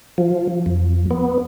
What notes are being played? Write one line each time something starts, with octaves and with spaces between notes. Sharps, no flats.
F3
F2
B3